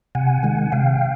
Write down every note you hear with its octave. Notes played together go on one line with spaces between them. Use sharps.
C3 F#5 G#5
D#3 G#3
C3 F5 G5